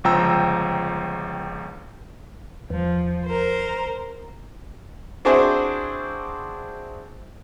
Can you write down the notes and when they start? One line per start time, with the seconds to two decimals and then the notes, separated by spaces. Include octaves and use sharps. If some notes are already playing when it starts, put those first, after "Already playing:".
0.04 G1 C#2 F3 G5 A#5 E6
2.70 E2 F3
3.26 A#4 C5
5.25 C4 D4 E4 F#4 G#4 C5